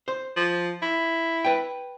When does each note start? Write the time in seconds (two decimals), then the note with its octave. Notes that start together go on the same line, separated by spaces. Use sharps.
0.08 C5
0.36 F3
0.82 E4
1.45 B4 G5